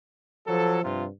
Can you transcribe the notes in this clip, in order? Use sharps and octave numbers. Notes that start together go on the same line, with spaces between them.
F3 F#3 A4
G2 C3 F3 F4